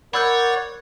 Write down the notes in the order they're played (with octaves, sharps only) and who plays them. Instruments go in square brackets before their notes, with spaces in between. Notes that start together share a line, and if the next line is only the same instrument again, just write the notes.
[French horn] A#4 [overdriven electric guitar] C#5 [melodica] D5 F#5 [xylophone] B5 E6 G6